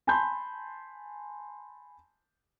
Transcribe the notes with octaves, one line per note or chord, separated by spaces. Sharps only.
G#5 A5 B5 C6 G6